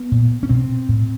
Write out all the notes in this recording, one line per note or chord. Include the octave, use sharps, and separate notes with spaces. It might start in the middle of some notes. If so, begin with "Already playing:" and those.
Already playing: B3
A#2
C#4
B2 C4
A2